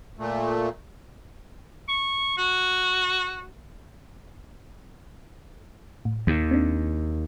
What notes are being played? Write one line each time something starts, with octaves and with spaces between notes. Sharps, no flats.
A#2 A3
C#6
F#4
A2
D#2 D#3
C4 D4